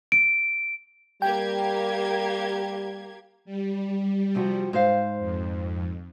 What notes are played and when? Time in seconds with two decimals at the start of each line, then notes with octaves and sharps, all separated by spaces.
0.12 D7
1.22 G3 A#3 G4 G5 G#6
3.45 G3
4.35 C3 F3 F#4
4.73 G#2 C5 F5
5.19 F2